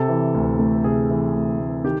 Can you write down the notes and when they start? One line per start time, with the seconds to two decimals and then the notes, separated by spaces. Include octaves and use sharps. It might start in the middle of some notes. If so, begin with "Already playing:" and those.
Already playing: C3 A4
0.09 E3
0.34 D2
0.59 A3
0.84 C3 G#4
1.10 E3
1.34 D2
1.60 A3
1.84 D#3 G4